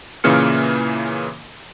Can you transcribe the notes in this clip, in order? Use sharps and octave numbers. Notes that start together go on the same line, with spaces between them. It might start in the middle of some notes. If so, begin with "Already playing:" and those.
A#2 C#3 E3 A#3 F6 C#7